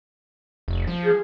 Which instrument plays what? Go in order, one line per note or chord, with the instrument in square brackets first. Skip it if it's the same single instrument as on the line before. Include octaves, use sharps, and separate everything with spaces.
[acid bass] F1
F3
[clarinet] G#4